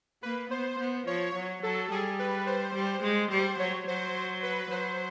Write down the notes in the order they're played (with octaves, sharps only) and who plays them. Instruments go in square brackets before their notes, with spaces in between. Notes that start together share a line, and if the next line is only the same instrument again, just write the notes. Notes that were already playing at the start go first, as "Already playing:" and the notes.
[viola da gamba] A#3 [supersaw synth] B4
[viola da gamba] B3 [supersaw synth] C5
[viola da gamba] B3
[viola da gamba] F3 [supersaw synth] C#5
[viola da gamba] F#3
[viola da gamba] F#3 [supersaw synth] A4
[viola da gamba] G3 [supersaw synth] G#4
[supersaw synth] B4
C5
[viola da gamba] G3
G#3
[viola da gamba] G3 [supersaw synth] C5
[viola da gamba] F#3 [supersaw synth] C#5
[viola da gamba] F#3 [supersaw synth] C5
[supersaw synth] C5
B4
[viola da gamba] F#3 [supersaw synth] C5